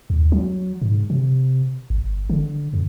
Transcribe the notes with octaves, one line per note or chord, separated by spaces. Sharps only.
D#2
F#3
G#2
C3
G1
D3
F2